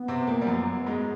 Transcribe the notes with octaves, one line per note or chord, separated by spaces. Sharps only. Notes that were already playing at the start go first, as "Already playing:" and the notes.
Already playing: B3
C3 C4
A#2 A#3
G3
F#2 F#3
G#2 G#3